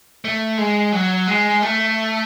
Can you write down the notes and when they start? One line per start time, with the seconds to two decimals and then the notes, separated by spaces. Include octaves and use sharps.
0.25 A3
0.58 G#3
0.92 F#3
1.27 G#3
1.62 A3